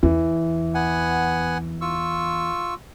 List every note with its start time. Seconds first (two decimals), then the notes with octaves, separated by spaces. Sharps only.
0.03 E2 E3
0.74 B3 F#5 G#5
1.81 F4 C#6 E6